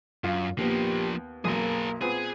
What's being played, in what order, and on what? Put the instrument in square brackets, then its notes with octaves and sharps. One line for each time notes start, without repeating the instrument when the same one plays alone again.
[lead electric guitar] F#2 [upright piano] F4
[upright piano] D#2 B3 [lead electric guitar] F3 A#3 [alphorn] G4
[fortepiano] B1 F#2 [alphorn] A#3 [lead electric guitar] G#4 A#4
[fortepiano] A#2 B3 C4 [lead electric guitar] G#4